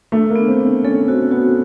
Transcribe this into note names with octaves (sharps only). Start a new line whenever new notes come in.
A3 D4
A#3
B3
C4
B3
C4
C#4 A4
C4 F#4
B3 F#4